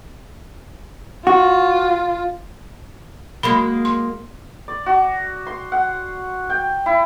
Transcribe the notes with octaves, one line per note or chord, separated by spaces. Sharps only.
F4 F#4
F#3 G#3 A#3 B5
C6
D5
F#4
C6
F#5
G5
E4